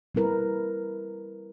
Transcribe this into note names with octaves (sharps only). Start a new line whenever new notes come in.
G3 C4 E4 A#4 B4